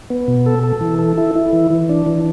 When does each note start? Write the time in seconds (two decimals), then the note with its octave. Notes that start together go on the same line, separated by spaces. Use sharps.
0.10 B3
0.28 B2
0.46 A4
0.63 A4
0.81 E3
0.99 A4
1.18 E4
1.35 E4
1.53 E3
1.70 E3
1.89 D4
2.06 E3